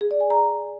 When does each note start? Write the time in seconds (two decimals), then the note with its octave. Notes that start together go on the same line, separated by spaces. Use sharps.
0.01 G#4
0.11 D5
0.21 G#5
0.30 A#5